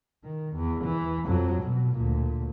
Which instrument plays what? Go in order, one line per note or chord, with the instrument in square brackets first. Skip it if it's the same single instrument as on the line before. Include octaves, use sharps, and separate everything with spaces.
[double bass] D#3
E2
E3
F2 F#3
B2
D2 A#2